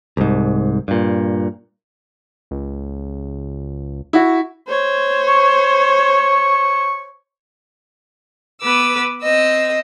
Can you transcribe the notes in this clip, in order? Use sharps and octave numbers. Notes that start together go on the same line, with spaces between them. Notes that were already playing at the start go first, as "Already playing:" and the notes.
C2 G#2
G2 A#2
C#2
E4 F#4
C5 C#5
C#6
B3 B4 D6 E6
C4 D#5 E6